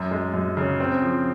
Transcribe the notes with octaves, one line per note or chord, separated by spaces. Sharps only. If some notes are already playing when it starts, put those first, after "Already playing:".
Already playing: F#2
G#3
F#2
C#3
C4
F3